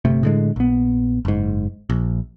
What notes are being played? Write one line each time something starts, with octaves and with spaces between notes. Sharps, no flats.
G1 C3 A3
A2 D3 G#3
A#1 B3
F#1 G#2
A#1